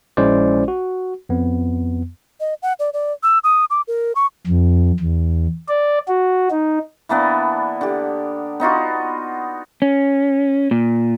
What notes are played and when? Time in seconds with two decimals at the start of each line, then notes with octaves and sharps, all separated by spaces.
0.17 A#1 G#3 C#4 E4 C5 D5
0.68 F#4
1.29 F2 B3
2.40 D#5
2.62 F#5
2.79 D5
2.93 D5
3.23 E6
3.44 D#6
3.70 D6
3.88 A#4
4.15 C#6
4.47 F2
5.00 E2
5.69 D5
6.08 F#4
6.51 D#4
7.09 E3 A#3 B3 D4
7.81 D3 G4
8.60 B3 D#4 F4 F#4
9.82 C#4
10.71 A#2